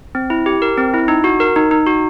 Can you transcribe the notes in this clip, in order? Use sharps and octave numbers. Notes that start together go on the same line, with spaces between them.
C4
E4
G4
A#4
C4
E4
D#4
F#4
A#4
D#4
D#4
F#4